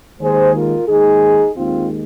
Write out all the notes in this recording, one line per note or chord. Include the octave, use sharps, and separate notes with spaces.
D#2 D#3 G#3 G#4 C5
F4 A#4
D#2 D#3 G#3 D#4 G#4
D#2 D#3 G#3 C4 F4